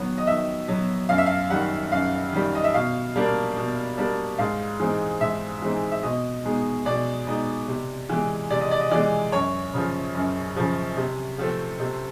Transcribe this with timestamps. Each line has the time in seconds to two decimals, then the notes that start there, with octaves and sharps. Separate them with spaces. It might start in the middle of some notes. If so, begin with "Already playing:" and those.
Already playing: D#3 F#3 B3
0.18 D#5
0.27 D#3 E5
0.68 F#3 B3
1.09 F#2 F5
1.18 E5
1.26 F5
1.50 D#3 G3 F#5
1.92 F#2 F5
2.33 D#3 G3
2.55 D#5
2.64 E5
2.74 B2 F5
3.16 G3 A#3 D4
3.56 B2
3.98 G3 A#3 D4
4.38 G#2 F5
4.80 E3 G#3 C4 D#4
5.21 G#2 E5
5.62 E3 G#3 C4 D#4
5.92 E5
6.03 B2 D#5
6.45 G#3 B3 D#4
6.85 B2 D5
7.27 G#3 B3 D#4
7.68 C3
8.10 E3 G#3
8.50 C3 D5
8.61 D#5
8.71 D5
8.81 D#5
8.91 E3 G#3 D5
9.32 F#2 C#5
9.73 C#3 F3
10.15 F#2
10.56 C#3 F3
10.97 C3
11.38 F3 A3 C4
11.80 C3